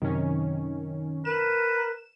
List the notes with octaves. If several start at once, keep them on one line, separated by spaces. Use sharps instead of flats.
F#2 C3 D#3 C#4
A#4 B4 E7